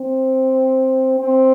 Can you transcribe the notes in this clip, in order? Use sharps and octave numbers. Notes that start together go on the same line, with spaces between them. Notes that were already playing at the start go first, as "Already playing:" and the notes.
Already playing: C4
C4